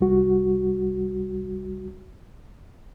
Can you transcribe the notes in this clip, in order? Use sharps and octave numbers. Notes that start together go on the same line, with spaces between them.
C2 G3 F#4